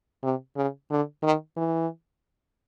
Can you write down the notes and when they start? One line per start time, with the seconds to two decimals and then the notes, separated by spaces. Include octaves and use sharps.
0.23 C3
0.56 C#3
0.91 D3
1.23 D#3
1.57 E3